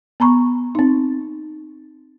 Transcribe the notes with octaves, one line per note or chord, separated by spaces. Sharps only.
B3 A#5 B5 C#6
C4 D#4